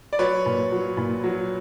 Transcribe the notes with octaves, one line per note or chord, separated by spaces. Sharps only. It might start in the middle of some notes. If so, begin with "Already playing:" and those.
D5
F#3 B4 C#5
A#2
F#3
A#2
F#3